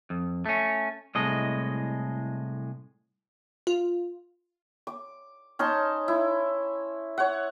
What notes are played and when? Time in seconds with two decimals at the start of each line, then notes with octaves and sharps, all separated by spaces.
0.10 F2
0.46 A3 C#4
1.15 C2 A2 G#3 D#5
3.67 F4
4.87 D6
5.59 C#4 D#4 A5 C6
6.08 E4
7.18 C#5 F#5